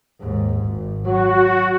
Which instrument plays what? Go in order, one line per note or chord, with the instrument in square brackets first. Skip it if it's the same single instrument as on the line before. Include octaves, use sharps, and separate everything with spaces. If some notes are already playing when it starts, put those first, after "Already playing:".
[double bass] D#2 G#2
G#1
[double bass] F#3 [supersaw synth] F#4